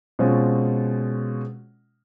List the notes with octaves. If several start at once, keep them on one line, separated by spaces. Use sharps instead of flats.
B2 G#3 C4 C#4 F4